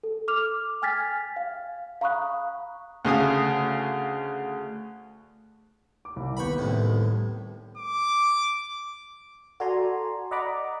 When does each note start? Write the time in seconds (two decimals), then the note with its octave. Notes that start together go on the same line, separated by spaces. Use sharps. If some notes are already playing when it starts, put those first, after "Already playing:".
0.03 A4
0.28 D6 F6 F7
0.82 G5 G#5 F6 G#6 A6 B6
1.36 F5
2.01 F5 A#5 B5 C#6 D#6 F#6
3.05 D2 C#3 F5 D#6
6.05 D6
6.16 C2
6.37 D#2 B3 B5 C#6 G6
6.58 C2 A2
7.78 D6
9.60 F#4 A4 D5 G#5 A#5 C6
10.31 D5 D#5 F#5 A#5 B5 D6